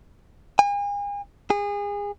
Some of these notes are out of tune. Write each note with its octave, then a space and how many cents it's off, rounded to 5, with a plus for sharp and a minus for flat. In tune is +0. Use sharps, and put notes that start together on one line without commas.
G#5 -40
G#4 -30